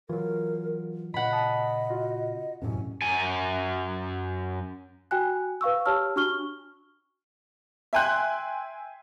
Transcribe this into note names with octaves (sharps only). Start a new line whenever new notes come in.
E3 F#3 F4 A#4
A#2 C#3 D#5 F#5 B5
A5 D#6 B6
F4 F#4
E1 F#2 A2 C3 C#4
F#2 G#5
F#4 G5 G#5 F#6
B4 F5 C#6 E6
G4 C#5 A5 E6 F6
D4 F#4 C#6 F6 G7
E5 G5 G#5 C6 F#6